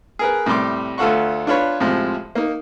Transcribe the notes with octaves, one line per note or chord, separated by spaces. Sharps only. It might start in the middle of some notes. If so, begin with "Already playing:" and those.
G#4 A#4 B4
A2 C3 G3 C6 D6
D2 F4 A4 F#5 C#6
D4 F4 B4 C#5 B5
A2 C3 F3 G#3
A#3 D#4